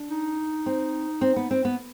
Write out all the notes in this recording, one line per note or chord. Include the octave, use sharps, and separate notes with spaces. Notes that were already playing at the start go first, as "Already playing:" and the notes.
Already playing: D4
D#4
C4
C4
B3
C4
B3